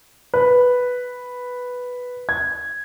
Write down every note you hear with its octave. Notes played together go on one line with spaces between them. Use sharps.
B4
G#6